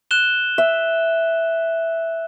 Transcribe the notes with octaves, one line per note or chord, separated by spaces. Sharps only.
F#6 E7 G7
E5